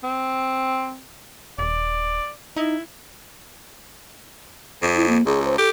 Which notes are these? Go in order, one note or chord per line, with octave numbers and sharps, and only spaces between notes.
C4
D#1 D5
D#4 E4
F2
E4
A#3
C#2 G#4
C5
G4 A4